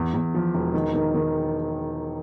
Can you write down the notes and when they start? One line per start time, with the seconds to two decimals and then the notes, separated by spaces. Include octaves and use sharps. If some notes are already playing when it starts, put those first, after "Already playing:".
Already playing: E2
0.14 E2
0.34 F3
0.55 E1
0.74 D#3
0.94 D#3
1.15 D#3